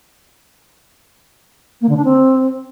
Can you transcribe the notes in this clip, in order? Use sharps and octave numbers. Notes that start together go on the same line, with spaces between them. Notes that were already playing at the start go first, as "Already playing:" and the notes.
A#3
D3
D4
C4